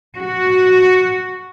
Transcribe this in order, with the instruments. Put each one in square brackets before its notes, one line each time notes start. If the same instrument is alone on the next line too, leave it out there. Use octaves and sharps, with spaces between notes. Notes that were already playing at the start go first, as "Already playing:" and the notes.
[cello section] F#4